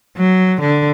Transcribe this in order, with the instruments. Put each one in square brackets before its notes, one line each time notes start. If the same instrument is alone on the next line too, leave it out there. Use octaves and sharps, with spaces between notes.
[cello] F#3
D3